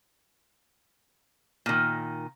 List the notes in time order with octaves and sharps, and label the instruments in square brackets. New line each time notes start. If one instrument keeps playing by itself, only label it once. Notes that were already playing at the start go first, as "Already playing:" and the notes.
[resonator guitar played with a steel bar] A#2 D#3